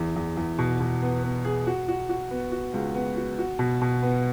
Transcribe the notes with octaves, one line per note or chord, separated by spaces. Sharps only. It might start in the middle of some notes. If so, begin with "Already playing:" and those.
Already playing: E2
E2
E2
B2
B2
B3
B3
G#4
F#4
F#4
F#4
B3
F#4
C#2
B3
F#4
F#4
B2
B2
B3